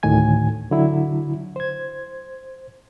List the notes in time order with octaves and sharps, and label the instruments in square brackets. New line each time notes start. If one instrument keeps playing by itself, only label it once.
[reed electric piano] D2 A2 D#3 G#5 G#6
D3 F#3 E4
C5 G#6